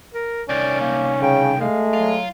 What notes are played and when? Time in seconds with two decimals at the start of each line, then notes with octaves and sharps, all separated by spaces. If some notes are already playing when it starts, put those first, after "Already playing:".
0.14 A#4
0.49 C2 D#3 C#4 D5
0.80 A#3
1.22 C#3 G5
1.61 G#3 A3 F5
1.93 F#3 F4